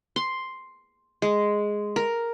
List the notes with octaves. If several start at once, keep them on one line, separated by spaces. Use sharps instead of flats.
C6
G#3
A#4